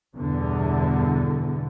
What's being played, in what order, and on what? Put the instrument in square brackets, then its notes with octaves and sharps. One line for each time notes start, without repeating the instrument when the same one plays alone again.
[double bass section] E2 G2 B2 D3 E3